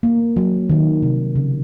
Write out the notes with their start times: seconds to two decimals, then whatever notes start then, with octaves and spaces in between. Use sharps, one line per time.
0.03 A#3
0.37 F#3
0.70 D#3
1.02 C3
1.36 C#3